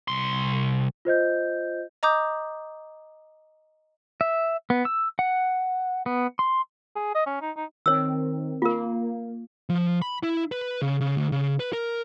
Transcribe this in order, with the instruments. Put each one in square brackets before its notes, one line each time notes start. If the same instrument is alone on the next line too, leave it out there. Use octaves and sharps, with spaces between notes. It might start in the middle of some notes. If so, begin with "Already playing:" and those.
[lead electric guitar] C2 C6
[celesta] F4 C5 D#5 G6
[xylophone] D#5 A#5 D6 D#6 G6
[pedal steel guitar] E5
B3
E6
F#5
B3
C6
[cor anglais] G#4
D#5
C#4
D#4
D#4
[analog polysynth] D#3 C4 [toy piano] C#5 E6
[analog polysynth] A#3 [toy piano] F4 A#4
[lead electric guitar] F3
B5
E4
B4
C#3
C#3
D2
C#3
B4
A#4